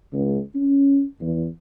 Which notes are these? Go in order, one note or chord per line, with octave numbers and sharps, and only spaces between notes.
C#2
C#4
E2